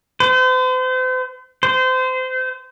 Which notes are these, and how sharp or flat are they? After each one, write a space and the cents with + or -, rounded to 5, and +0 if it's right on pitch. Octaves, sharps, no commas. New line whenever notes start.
C5 -40
C5 -25